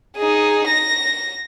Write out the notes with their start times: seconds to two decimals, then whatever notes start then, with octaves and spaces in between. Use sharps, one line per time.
0.16 D#4 G#4
0.67 A#6